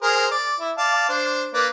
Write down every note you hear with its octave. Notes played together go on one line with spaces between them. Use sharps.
G#4 A#4 C5
D5
E4
D5 F5 A5
D4 C5
A#3 B4 D5